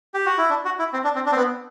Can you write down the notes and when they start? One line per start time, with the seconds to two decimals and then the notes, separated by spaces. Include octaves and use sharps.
0.14 G4
0.26 F#4
0.38 E4
0.50 D4
0.65 F#4
0.79 E4
0.93 C4
1.04 D4
1.15 C4
1.26 D4
1.32 C4
1.36 B3